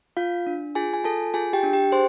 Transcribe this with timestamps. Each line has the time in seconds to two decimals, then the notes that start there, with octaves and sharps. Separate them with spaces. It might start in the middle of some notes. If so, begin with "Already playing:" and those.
0.17 F4 F5
0.47 D4
0.75 F4 G#4 G#5
0.94 G#5
1.04 F4 A4 A5
1.34 F4 G#4 G#5
1.53 G4 G5
1.63 D4
1.73 G4 G5
1.92 G#4 C5 C6